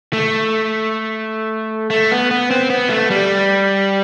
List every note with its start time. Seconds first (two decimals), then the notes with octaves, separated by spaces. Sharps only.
0.13 A3
1.90 A3
2.11 B3
2.31 B3
2.51 C4
2.70 B3
2.90 A3
3.10 G3